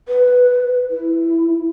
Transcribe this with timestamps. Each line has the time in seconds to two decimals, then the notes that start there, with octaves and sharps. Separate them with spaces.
0.08 B4
0.90 E4